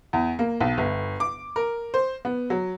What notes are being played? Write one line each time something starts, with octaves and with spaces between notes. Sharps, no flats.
E2
A#3
B1
G1
D6
A#4
C5
B3
F#3